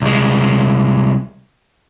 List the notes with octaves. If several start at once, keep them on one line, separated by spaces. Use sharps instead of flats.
C2 G#3